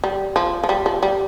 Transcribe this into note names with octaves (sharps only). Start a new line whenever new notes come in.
G3
F3
F3
G3
F3
G3